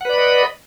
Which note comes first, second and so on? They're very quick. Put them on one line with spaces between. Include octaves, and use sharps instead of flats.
F#5 B4 D5 B5 D#5